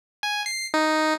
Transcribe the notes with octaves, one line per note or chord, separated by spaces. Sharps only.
G#5
C7
D#4